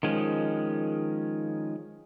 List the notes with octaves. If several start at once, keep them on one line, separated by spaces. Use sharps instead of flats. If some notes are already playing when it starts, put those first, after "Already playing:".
D#3 F3 G#3 C#4